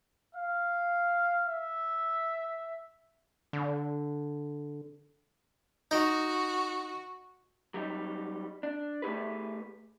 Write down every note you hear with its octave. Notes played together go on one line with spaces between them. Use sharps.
F5
E5
D3
D#4 F#4
F#3 G3 D#4
D4
A3 G4 G#4 B4